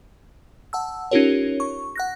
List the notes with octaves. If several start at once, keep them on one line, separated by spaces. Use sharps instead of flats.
F#5 A5 E6
C#4 D#4 F4 G4 A#4 C#5
C#6
F#5 F#6 A#6